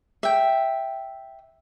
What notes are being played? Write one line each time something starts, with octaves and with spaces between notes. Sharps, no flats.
E5 G5